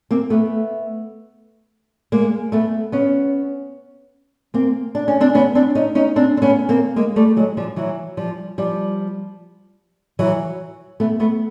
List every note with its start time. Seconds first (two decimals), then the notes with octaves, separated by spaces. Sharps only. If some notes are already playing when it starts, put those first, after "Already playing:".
0.11 A#3 C4
0.30 A3 B3
2.12 G#3 A#3
2.52 A3 B3
2.92 B3 C#4
4.54 A#3 C4
4.95 D4
5.08 C#4
5.20 C4 D4
5.35 B3 C#4
5.55 C4 D4
5.75 C#4 D#4
5.95 C#4 D#4
6.16 C4 D4
6.37 C4
6.42 B3 C#4
6.69 A#3 C4
6.96 G#3 A#3
7.16 G3 A3
7.37 F#3 G#3
7.57 F3 G3
7.76 E3 F#3
8.17 F3 G3
8.58 F3 G3
10.19 E3 F#3
11.00 A3 B3
11.20 A3 B3